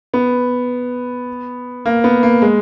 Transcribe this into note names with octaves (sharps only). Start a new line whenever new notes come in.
B3
A#3
B3
A#3
G#3